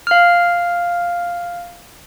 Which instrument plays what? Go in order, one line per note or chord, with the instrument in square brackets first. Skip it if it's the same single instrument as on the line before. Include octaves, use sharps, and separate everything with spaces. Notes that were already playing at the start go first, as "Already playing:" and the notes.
[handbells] F5 F6